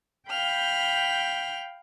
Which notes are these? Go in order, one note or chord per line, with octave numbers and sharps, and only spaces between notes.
F5 G5 B5 F6 G6